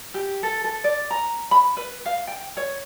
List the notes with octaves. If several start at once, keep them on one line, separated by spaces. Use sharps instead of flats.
G4
A4
A4
D5
A#5
B5
B4
F5
G5
C#5